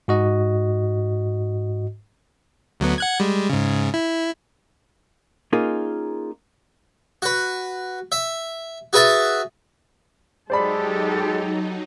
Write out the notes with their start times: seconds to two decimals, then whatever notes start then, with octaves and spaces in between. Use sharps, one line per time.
0.08 G#2 F#4 D#5
2.80 D2 F#3 B3
2.98 F#5 F#6 G#6
3.20 G3 G#3
3.50 G#2 C#3
3.94 E4
5.53 A#3 C#4 D#4 F4 G#4 A#4
7.22 F#4 B4
8.12 E5
8.93 F#4 G#4 B4 E5 A5
10.50 F#3 G#3 D#4 G4 A4 C5 D5 B5